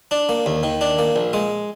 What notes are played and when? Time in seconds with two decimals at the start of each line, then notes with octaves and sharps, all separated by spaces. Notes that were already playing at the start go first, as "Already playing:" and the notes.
0.11 D4
0.29 A#3
0.46 D#2
0.63 D#3
0.81 D4
0.99 A#3
1.16 A#1
1.33 G#3